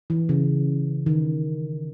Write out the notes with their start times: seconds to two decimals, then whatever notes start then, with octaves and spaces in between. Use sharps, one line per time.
0.10 E3
0.29 C#3
1.06 D#3